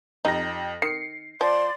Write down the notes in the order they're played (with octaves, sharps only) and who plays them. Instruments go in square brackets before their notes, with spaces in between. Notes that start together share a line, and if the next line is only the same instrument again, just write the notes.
[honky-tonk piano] F2 G4 A#6 [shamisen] D#4
[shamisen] D#3 [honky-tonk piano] C7 C#7
[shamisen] F3 G5 [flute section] D5 [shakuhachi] C6